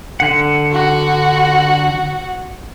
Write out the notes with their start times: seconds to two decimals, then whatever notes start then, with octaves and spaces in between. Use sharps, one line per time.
0.20 D3 F#5
0.72 F#4